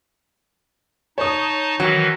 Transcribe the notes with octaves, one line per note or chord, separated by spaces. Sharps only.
D#4 C#5 A5 D#6
D#3 E3 F#3